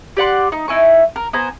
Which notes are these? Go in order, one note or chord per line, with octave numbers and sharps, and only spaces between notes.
G4 D5 F#5 C6
D#4
D#4 E4 G#5 C#6
A#4
B3 C5 G#5 A#5